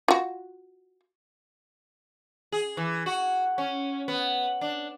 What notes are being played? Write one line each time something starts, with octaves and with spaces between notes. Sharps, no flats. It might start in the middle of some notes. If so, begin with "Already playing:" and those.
F4 F#4
G#4
E3
F#4
C#4
B3
D4